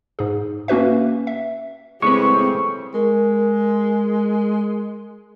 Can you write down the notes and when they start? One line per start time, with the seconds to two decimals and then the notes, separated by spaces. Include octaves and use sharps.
0.19 G#2 G#4
0.68 A#3 C#4 F#4 B4 E5
1.27 E5
2.02 A2 C#3 G#3 C4 G4 B4 C#6
2.94 G#3 A#4